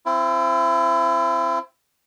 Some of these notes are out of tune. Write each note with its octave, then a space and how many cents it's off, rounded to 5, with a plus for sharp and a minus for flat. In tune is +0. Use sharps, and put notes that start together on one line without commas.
C4 +5 E4 +40